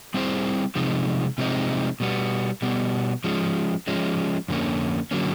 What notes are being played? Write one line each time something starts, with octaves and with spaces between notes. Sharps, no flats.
G3 C4 E4 G#4 C5
C3 F3 G#3 C4 D#4
C3 F3 G#3 C4 D#4
B2 G3 B3
B2 G3 B3
F3 G#3 C#4
F3 G#3 C#4
F2 D3 F#3 A#3 C#4
D3 F#3 A#3 C#4